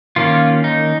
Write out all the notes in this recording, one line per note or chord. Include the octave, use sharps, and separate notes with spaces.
D#3 A#3 C#4 F4
D#4